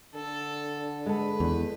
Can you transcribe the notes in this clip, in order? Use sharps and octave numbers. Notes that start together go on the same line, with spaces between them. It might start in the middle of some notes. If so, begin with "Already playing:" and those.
D3 A4
G#3 A4 B4
E2